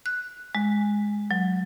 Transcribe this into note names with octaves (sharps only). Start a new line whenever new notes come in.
F#6
G#3
F#3